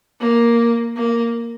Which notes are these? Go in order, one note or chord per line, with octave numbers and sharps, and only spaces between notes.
A#3
A#3